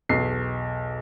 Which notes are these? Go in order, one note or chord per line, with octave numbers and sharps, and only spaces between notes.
B1 E2 C7